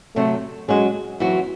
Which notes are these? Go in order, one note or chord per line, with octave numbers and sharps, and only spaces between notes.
C3 F#3 A3 C4
F#3 G#3 C#4 F#4
E3 F#3 C4 F#4